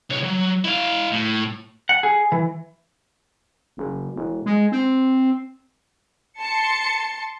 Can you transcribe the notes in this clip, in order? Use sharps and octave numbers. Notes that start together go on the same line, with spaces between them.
C2 C#5
F#3
E4 F5
A2
F#5
G#4
E3
F#1
E1
G#3
C4
A5 C6 C#7